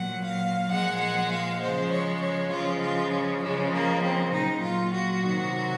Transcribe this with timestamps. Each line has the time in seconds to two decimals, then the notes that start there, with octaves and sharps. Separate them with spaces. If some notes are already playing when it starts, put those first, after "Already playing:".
Already playing: A#2 F#3 F#5
0.25 F5
0.71 A#2 F3 G#3 F#5
1.01 F#5
1.32 F5
1.61 C#3 F3 G#3 C5
1.92 C#5
2.21 C#5
2.52 C#3 F3 G#3 F4
2.82 F4
3.12 C#4
3.42 C#3 F3 G#3 C#4
3.73 A#3
4.03 C4
4.33 A#2 F#3 D#4
4.63 F4
4.94 F#4
5.24 C3 D#3 F#3